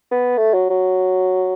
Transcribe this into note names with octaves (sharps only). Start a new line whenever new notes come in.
B3
A3
F#3
F#3